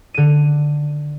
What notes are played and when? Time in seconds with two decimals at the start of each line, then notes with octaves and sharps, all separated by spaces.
0.14 D3 D#7